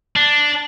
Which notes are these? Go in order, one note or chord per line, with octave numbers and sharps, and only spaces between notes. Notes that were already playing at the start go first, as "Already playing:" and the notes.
D4